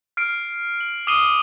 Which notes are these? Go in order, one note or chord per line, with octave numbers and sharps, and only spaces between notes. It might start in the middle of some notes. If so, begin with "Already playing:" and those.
F6 C7 D7
F#7
D6 D#6 F6 C7 D#7 G7